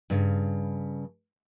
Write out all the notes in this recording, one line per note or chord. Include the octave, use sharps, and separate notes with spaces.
G2 C#3